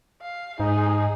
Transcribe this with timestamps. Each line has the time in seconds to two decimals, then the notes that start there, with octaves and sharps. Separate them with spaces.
0.21 F5
0.60 G#2 D#4 G#4